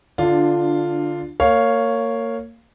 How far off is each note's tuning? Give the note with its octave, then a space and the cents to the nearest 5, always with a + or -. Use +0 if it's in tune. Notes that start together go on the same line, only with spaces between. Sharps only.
D3 +0 D4 +20 F4 +0
A#3 -25 C#5 +0 F5 +0